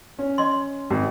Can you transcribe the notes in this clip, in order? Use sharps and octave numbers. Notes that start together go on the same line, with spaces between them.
C#4
D#5 C6
G#1